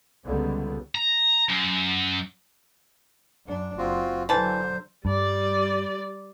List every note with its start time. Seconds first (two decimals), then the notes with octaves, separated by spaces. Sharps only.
0.25 C#2 D3 D#3 G3 B3
0.95 A#5
1.49 F#2
3.46 F#2 D4
3.78 F#1 C4 F4 F#4
4.29 D3 E3 F#3 C5 A5
5.05 G2 G3 D5